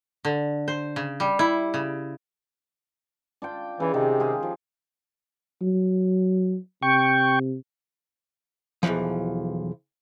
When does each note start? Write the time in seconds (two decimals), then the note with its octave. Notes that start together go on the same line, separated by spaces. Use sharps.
0.25 D3
0.68 C5
0.96 C#3
1.20 G3
1.39 E4
1.74 C#3
3.42 D4 F4 G5
3.80 C#3 E3 D5
3.94 C3 D#3
4.20 F4 G4 G#4
4.43 F3
5.61 F#3
6.83 C3 G5 C#6
8.83 B1 E2 G#2 E3 F3